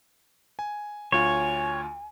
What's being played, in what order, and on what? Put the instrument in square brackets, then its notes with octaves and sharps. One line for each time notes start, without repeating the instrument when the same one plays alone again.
[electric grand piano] G#5
[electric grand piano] D2 F4 [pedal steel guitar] C#5 [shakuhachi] G#5